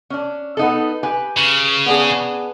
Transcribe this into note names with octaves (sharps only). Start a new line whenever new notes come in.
C#4 D4
B3 D#4 A4
G4 B4 G#5
C#3
B3 D4 G#4